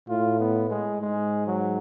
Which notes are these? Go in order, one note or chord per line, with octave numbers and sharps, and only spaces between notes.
A2 F4
B3
G#3
G#2 G#3
F#3